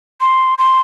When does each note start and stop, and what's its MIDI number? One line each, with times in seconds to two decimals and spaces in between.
0.21 0.54 84
0.58 0.81 84